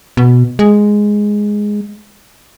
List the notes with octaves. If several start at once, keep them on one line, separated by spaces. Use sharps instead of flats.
B2
G#3